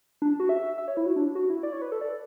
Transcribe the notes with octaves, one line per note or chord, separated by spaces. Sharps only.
D4
F#4
E5
E5
C#5
E4
F#4
D4
F#4
E4
D5
C#5
B4
A4
D5